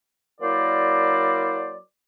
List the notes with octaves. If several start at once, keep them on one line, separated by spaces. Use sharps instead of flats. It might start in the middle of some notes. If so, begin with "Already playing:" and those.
F#3 A#3 E4 A#4 C5 D5